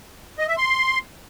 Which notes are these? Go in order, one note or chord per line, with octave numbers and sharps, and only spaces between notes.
D#5
E5
C6